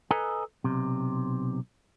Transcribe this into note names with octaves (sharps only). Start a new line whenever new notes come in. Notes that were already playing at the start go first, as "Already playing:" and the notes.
A4 B4 D#5 G#5 A#5
B1 C3